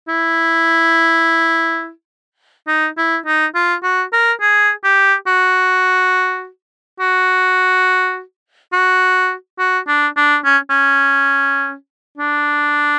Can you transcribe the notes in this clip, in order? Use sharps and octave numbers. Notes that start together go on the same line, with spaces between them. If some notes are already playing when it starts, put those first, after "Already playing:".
E4
D#4
E4
D#4
F4
F#4
A#4
G#4
G4
F#4
F#4
F#4
F#4
D4
D4
C#4
C#4
D4